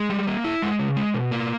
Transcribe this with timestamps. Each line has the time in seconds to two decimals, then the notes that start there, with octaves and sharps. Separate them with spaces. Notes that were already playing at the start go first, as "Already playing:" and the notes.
Already playing: G#3
0.10 G3
0.27 A#3
0.44 E4
0.62 G#3
0.79 C#3
0.97 G#3
1.14 B2
1.31 A#3